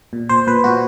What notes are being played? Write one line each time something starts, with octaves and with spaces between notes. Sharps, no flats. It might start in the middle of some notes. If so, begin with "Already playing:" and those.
A#2
A#2 C5
A#2 B4
A#2 F#4